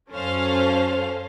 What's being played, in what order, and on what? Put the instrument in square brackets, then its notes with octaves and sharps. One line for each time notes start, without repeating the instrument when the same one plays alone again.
[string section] F#2 C#4 A4 C5 F5